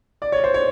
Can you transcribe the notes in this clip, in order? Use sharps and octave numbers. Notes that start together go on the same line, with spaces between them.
D5
C#5
C5
C#5